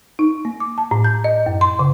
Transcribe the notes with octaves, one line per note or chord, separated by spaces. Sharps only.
D#4
A#3
D6
A5
A2
G6
D#5
F#2
C6
C#3